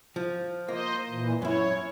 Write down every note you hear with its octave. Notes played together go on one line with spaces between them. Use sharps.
F3
A#3 C5 D#5
A#2 E3
F#2 E4 C#5